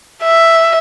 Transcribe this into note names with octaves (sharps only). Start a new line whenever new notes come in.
E5